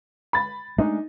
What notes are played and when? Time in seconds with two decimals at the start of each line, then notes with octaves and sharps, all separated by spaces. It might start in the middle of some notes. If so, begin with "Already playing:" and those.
0.33 B5 A6
0.78 G#3 A3 D4 D#4